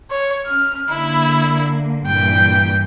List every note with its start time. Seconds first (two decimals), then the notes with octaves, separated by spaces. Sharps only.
0.11 C#5
0.46 C#4 F6
0.89 D3 A#3 E4
2.06 G2 A#2 E3 G5